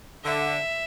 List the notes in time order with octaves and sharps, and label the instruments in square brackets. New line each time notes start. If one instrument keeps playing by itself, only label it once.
[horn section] D3 [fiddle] E5